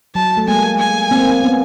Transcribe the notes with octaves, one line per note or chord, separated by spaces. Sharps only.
F#3 A5
A3
G#3 A#3 G#5
G#5
A#3 C4
B3 C#4